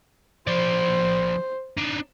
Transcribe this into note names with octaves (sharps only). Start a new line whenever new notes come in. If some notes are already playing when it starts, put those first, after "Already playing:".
F3 C5 D5
D4 D#4